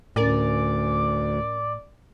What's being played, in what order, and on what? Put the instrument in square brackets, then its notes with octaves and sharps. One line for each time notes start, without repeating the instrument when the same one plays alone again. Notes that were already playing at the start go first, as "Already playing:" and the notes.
[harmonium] D2 [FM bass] A2 [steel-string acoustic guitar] C#4 A#4 G#5 [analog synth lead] D5